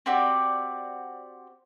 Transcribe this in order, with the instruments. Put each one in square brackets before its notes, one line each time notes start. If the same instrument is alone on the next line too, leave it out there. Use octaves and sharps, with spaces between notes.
[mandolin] C4 F#4 G4 D5